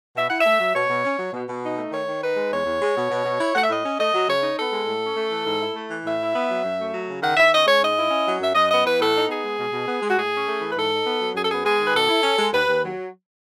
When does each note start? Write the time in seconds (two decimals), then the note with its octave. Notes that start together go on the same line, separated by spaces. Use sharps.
0.16 B2 E5
0.27 E4 F#5
0.39 E5
0.46 A3
0.61 F#3
0.75 B2 C#5
0.90 B2
1.05 C#4
1.19 F#3
1.33 B2
1.49 B2
1.64 D#4
1.78 A3
1.92 D#3 C#5
2.07 D#3
2.22 D#4 B4
2.36 G#3
2.52 E2 C#5
2.66 E2
2.82 G#3
2.96 B2
3.10 B2
3.25 B2
3.41 E4
3.55 A3 F#5
3.62 E5
3.69 A2 D#5
3.85 C#4
3.98 A3 D#5
4.14 F#3
4.28 C#3 C#5
4.43 D#4
4.58 B3 A4
4.72 G#3
4.87 A2
5.02 C#4
5.17 A3
5.31 E3
5.47 G#2
5.61 E4
5.76 A3
5.91 E3
6.05 A2 E5
6.20 E4
6.35 B3
6.50 F#3
6.65 F#2
6.79 A3
6.94 F#3
7.09 C#3
7.23 D#3 F#5
7.37 D#3 E5
7.52 C#4 D#5
7.67 G#3 C#5
7.83 G#2 D#5
7.97 E4
8.11 C#4
8.26 F#3
8.40 F#2 E5
8.55 F#2 D#5
8.70 B3 D#5
8.85 E3 B4
9.00 A2 A4
9.15 D#4
9.29 B3 G#4
9.45 G#3
9.59 B2
9.73 B2
9.88 B3
10.02 G#3
10.09 F#4
10.17 A2 G#4
10.32 C#4
10.47 A3
10.62 E3
10.70 B4
10.76 G#2 A4
10.91 D#4
11.06 B3
11.21 F#3
11.35 F#2 G#4
11.43 A4
11.50 B3 G#4
11.65 G#3 G#4
11.79 D#3
11.85 B4
11.94 B2 A4
12.09 E4
12.23 C#4
12.39 G#3
12.53 D#2 B4
12.68 D#2
12.82 F#3